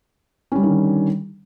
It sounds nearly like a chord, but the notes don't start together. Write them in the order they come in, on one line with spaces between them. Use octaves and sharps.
C#4 G3 D3 D#3